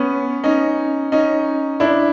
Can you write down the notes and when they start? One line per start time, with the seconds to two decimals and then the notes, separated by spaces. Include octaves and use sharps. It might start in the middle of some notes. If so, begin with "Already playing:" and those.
Already playing: B3 C#4
0.44 C#4 D#4
1.12 C#4 D#4
1.80 D4 E4